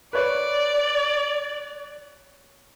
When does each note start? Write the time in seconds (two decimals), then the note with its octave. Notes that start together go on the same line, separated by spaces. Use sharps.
0.13 B4 C#5 D5